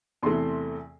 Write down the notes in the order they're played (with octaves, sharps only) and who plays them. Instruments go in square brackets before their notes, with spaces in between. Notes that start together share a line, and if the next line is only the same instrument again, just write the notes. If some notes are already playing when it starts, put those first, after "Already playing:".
[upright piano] E2 C3 E3 A3 C6